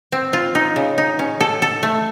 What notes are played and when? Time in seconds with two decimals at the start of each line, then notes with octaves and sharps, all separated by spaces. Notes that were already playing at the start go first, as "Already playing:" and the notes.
0.12 C4
0.33 F4
0.55 D#4
0.76 C#3
0.98 D#4
1.19 C#4
1.41 A4
1.62 A4
1.83 A3